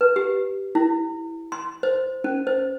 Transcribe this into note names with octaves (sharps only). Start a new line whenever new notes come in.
B4
G4
E4
C6
C5
C#4
C5